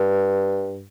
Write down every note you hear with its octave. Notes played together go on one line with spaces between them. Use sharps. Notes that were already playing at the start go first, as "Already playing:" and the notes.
Already playing: G2